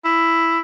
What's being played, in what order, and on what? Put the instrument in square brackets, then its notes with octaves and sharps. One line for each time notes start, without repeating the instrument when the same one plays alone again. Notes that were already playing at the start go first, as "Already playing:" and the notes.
[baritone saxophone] E4